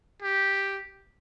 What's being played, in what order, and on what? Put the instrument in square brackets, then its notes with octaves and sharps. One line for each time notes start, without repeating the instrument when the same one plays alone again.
[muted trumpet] G4